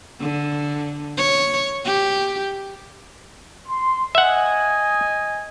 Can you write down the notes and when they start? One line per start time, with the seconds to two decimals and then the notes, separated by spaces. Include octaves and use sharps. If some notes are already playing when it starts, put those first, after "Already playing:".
0.20 D3
1.18 C#5
1.85 G4
3.67 C6
4.15 D#5 E5 F#5 G#5